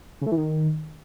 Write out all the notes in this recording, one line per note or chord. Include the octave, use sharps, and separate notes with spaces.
C#3
A3
E3
D#3